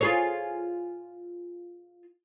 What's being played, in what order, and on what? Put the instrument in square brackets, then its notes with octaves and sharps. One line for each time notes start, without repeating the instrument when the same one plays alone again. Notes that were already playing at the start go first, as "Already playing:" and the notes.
[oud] F4 G#4 C#5